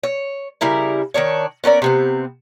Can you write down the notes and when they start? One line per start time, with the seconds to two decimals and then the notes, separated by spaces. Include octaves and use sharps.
0.03 C#5
0.61 C#3 G3 E4 A#4
1.14 D#3 A#3 D4 C#5
1.64 B3 C#4 A#4 D5
1.82 C3 B3 C4